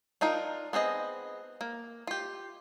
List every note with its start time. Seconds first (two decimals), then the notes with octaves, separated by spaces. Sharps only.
0.21 D4 D#4 F4 A#4
0.73 B3 C4 G#4 D#5
1.61 A#3
2.07 F4 G4